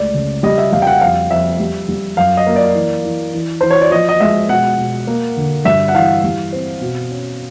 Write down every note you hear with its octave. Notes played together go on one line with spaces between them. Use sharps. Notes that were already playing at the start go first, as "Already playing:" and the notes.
Already playing: C#2 A3 D5
C#3
G3 D#5
E5
G3 F5
G5
F#5
F2 F5
F2 E5
G3
G3
F#2 F5
D#5
A#3
D5
E3
E3
E3
E3 C5
C#5
D5
F3 D#5
D#5
G#3 E5
B2 F#5
B2
A#3
D3
G2 E5
F#5
E3 F5
G3
C4
B2
C#4